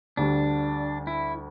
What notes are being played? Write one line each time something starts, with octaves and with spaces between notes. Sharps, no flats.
D2 D3 G3 D4
E4